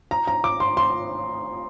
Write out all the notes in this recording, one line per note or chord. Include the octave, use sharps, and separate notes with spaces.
A#5
A#5
D6
C6
C6